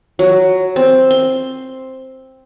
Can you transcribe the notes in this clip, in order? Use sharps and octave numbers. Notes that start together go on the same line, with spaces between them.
F#3
C4
C6